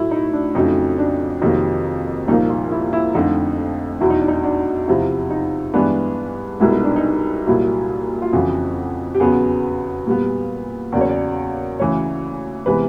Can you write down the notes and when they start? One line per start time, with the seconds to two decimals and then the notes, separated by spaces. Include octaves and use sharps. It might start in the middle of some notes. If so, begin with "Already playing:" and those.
Already playing: A2 F#3 A3 E4
0.11 D#4
0.33 D4
0.55 F2 C#3 F#3 A3 D#4
0.98 D4
1.42 F2 C3 D#3 F#3 A#3 D#4
2.28 C2 A#2 F3 A#3 D#4
2.50 F4
2.71 E4
2.93 E4
3.14 F2 D3 F3 A3 D#4
4.00 E2 B2 F#3 E4
4.10 D#4
4.20 D4
4.28 D#4
4.44 D4
4.87 E2 C3 F3 E4
5.30 D#4
5.74 G2 E3 G#3 B3 D4
6.60 C2 B2 G#3 B3 E4
6.72 D#4
6.84 D4
6.96 D#4
7.47 C2 A#2 F#3 E4
8.22 F4
8.33 F2 C#3 E3 F#4
9.15 G4
9.20 E2 C#3 F#3 B3 G#4
10.07 A#2 G3 B3
10.92 E2 C#3 F#3 A#3 D5
11.01 C#5
11.09 D5
11.79 D2 C#3 E3 C#5
12.66 C3 E3 G#3 B3 B4